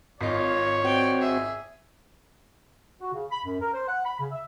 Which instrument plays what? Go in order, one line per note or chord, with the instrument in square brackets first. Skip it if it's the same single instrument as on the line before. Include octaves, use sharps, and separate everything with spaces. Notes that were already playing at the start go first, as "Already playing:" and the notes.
[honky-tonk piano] G#1 D#5 [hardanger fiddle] F4 [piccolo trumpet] C#5
[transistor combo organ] C4 F#4 [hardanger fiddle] D5 G5
[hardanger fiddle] G#4 E5
[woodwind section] F#4
C#3
B5
F#2
A#4
C5
F#5
B5
C#3
E5